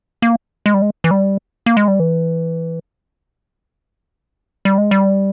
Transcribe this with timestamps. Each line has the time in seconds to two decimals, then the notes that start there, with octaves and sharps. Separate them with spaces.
0.22 A#3
0.66 G#3
0.74 G3
0.82 G#3
1.04 E3
1.11 G3
1.66 A#3
1.77 G#3
1.88 G3
2.00 E3
4.65 G3
4.78 G#3
4.91 G3